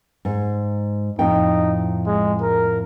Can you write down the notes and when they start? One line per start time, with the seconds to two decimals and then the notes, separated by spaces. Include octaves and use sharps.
0.25 G#2
1.19 F2 A2 D#4 G5
2.06 G#3
2.41 A#4